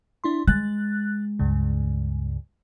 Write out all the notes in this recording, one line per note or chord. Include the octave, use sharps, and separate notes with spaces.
D4 E4 C6
G#3 F#6 A6
C#2 G2 C#3